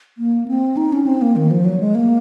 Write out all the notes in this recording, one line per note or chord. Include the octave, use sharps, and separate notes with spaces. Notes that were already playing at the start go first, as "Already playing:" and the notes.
A#3
C4
D#4
C#4
C4
A#3
D#3
F3
F#3
G#3
A#3